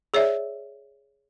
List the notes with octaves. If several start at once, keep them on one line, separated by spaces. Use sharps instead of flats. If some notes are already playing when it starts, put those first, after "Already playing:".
G#4 C#5 D5 E5